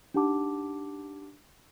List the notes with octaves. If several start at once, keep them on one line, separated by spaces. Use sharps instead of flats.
D4 D#4 G4 F#5 A5 D6